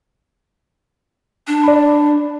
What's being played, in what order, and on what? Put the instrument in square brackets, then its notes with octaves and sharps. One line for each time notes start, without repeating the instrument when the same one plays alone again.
[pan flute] D4
[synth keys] D5 B5